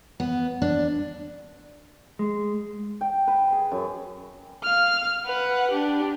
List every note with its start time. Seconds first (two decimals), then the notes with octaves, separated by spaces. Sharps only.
0.20 B3
0.62 D4
2.19 G#3
3.01 G5
3.27 B4
3.52 G#4
3.72 F#2
4.63 F5 F6
5.26 B4 F#5
5.71 D4 G4